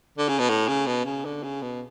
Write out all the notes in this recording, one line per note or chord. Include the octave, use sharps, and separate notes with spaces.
D3
C#3
B2
A2
C#3
B2
C#3
D3
C#3
B2